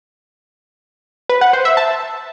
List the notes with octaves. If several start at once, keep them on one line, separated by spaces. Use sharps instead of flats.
B4
F#5
C5
E5
A5